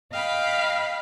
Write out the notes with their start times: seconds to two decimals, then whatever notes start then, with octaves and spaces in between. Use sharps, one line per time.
0.11 D#5 F5 G5 B5